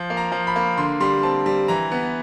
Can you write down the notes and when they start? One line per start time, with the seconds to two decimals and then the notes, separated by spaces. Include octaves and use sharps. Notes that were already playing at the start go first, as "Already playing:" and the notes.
Already playing: F3
0.10 A#3
0.17 A#5
0.32 F3
0.47 B5
0.56 A#3
0.78 D3 C6
1.00 G3 C6
1.23 C4 A5
1.46 G3
1.68 E3 A#5
1.92 B3